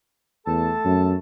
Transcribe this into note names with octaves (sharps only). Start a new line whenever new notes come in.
E2 A3 A4 A5
F#2